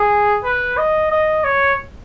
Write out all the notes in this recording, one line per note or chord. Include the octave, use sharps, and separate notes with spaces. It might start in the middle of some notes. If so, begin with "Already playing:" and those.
Already playing: G#4
B4
D#5
D#5
C#5